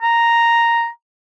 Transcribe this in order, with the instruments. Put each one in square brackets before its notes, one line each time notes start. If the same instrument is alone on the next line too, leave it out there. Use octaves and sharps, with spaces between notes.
[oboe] A#5